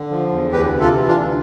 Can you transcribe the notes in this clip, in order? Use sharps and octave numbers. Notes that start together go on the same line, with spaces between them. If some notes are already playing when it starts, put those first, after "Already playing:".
Already playing: D3
F3
E2
D2 G4 B4
C3
F4 A4
E3
D4 F4
D2